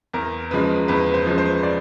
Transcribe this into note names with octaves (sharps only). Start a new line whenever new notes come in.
E2 A#4
C#3 F3 G#3 B4
E2 B4
C5
C#3 F3 G#3
C5
D5